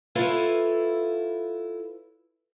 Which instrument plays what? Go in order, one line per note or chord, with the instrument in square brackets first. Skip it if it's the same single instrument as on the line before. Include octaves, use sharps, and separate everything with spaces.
[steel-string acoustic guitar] E4 F4 A4 B4 C#5 F5